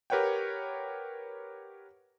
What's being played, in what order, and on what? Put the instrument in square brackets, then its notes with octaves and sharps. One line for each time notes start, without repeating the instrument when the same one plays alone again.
[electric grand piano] G4 A#4 B4 C#5 F#5 G5